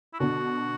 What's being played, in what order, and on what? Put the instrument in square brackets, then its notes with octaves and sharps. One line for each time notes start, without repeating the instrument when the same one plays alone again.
[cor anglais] E4
[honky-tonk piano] B2 D3 [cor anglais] F#4